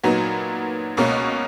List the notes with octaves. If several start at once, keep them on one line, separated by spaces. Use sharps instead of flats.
A#2 F#3 B3 D#4
C#2 B2 A#3 C#4